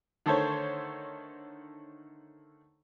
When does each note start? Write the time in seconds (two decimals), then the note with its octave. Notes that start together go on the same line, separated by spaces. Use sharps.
0.26 D3 D#3 A3 A4 C5 C#5